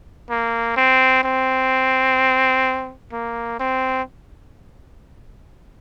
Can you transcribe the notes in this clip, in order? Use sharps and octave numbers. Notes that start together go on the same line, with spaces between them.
A#3
C4
C4
A#3
C4